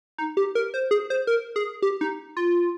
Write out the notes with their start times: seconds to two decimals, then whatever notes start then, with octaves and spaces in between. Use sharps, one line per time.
0.18 D#4
0.37 G4
0.55 A#4
0.74 C5
0.91 G#4
1.10 C5
1.27 A#4
1.56 G#4
1.82 G4
2.01 D#4
2.37 F4